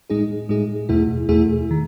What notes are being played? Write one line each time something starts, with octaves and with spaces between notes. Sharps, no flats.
A2 G#3 D#4 G#4
A2 G#3 D#4 G#4
E2 B2 A3 E4 G#4
E2 B2 A3 E4 G#4
D#3